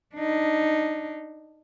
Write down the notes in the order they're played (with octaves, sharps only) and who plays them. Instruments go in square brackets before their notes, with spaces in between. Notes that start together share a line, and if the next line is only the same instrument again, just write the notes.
[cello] D4 D#4